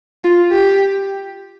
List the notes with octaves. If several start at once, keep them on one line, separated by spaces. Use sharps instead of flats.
F4
G4